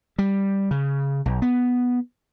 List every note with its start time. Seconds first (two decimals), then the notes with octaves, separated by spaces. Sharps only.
0.19 G3
0.71 C#3
1.26 B1
1.42 B3